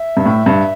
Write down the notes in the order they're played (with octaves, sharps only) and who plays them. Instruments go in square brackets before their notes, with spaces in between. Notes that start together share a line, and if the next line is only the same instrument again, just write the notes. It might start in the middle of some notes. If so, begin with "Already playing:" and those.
Already playing: [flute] E5
[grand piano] G2
A2
G2